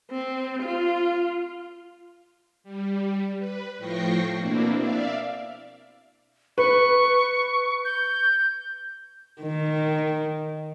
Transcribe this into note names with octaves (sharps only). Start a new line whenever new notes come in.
C4
F4
G3
B4
A2 F3 G5 C#6 A#6 C7
B2 A#3 C4 D4 E4
D5 E5 F5
B4 C#6
G6
D#3